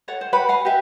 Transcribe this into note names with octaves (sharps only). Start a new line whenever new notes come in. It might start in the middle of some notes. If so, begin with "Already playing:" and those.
A4 C#5 F#5
C5
B4 F#5 G5 B5
F5 F#5 G#5
G4 B4 E5